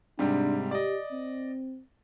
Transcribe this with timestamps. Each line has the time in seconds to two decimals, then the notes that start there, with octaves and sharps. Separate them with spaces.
0.19 G#2 C3 G3 D4
0.71 G4 D5 D#5
1.12 C4